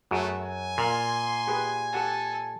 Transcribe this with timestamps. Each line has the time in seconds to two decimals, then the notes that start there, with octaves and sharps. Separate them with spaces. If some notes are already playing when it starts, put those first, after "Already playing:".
0.11 F#2 A3 F#4 G#4 C#5
0.44 G#5
0.78 A#2 A#4 F5 C6
1.47 G4 G#4 B4
1.93 G4 A4 F#5 A5